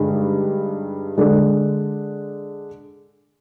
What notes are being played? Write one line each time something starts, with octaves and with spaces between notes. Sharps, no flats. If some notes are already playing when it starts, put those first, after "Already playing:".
Already playing: G2 D3 G#3 D#4
D3 G#3 D4